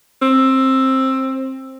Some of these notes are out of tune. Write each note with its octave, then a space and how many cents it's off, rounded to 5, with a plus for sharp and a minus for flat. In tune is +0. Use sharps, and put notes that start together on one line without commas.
C4 +15